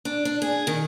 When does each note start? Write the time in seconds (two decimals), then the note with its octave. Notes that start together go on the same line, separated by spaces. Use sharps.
0.05 D4
0.25 D4
0.42 G#4
0.67 D#3